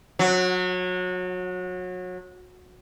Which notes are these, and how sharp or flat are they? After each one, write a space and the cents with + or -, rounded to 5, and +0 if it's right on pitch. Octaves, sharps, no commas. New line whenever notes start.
F#3 -25